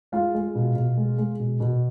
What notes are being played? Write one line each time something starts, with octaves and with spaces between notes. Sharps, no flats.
G#3 F4 F5
G#3
B2
B2
G#3
G#3
B2
B2